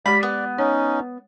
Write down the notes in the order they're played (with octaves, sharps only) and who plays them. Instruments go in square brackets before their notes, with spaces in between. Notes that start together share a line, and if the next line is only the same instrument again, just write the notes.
[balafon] G#3 G4 [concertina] D5 [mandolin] B5
[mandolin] B3
[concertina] C#4 D#4 [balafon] C#5